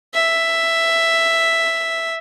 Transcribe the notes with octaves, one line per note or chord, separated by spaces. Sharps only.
E5